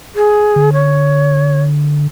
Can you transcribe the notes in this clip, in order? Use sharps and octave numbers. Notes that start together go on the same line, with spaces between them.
G#4
D3
C#5